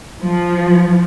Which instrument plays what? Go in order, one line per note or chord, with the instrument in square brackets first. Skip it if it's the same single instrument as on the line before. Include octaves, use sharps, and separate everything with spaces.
[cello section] F3